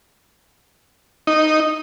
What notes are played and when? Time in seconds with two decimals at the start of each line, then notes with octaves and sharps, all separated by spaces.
1.27 D#4